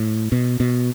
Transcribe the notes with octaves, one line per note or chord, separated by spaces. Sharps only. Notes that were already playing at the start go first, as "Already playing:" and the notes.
Already playing: A2
B2
B2